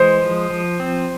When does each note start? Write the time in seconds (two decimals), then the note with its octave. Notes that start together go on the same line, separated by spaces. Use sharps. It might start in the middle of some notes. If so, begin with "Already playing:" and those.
Already playing: E3 G#3 C5
0.22 F3
0.50 F3
0.80 C4